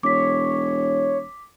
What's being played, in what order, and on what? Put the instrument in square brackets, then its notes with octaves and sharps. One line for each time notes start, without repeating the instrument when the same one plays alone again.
[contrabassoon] E1 [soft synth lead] C#5 [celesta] D6 B6